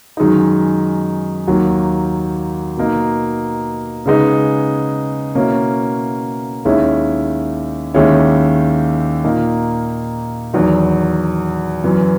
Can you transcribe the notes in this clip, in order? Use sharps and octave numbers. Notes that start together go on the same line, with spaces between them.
F#2 D#3 G#3 D#4
D#2 D#3 F#3 A#3
B2 A#3 D#4
C#3 G#3 B3 D#4
B2 A#3 C#4 E4
D#2 D#3 G#3 C#4 E4
D#2 D#3 G#3 C#4 E4
A#2 A#3 D#4
E2 D#3 F#3
F#2 E3 B3